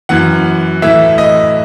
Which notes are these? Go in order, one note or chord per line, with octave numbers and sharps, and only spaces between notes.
F#2 E3 F#5
A2 E3 E5
D#5